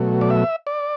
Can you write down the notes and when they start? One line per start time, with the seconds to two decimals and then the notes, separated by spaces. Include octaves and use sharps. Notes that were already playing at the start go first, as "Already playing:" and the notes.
Already playing: B2 F#3 A3
0.21 D5
0.30 E5
0.67 D5